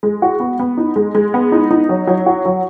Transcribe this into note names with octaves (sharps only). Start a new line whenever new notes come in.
G#3
F#4
B3
B3
D#4
G#3
G#3
B3
D#4
D#4
F#3
F#3
F#4
F#3